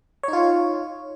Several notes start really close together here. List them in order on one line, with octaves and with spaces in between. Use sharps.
C#5 D#4 F4